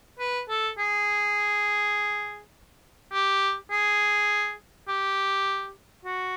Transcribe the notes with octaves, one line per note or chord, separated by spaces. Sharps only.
B4
A4
G#4
G4
G#4
G4
F#4